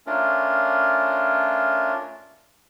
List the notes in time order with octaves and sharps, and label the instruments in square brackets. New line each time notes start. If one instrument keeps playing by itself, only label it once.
[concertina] A3 C#4 D4 F4 A#4